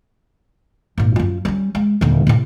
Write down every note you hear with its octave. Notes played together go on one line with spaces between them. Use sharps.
G#1 A#2
F#2 F4
G3 C#4
G#3
D#1 D3
A2 C3